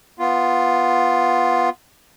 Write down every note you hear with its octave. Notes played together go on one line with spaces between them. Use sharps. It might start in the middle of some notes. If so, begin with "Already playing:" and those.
B3 F4